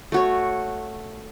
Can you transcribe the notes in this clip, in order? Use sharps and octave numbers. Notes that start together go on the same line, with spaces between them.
A3 F#4 C#5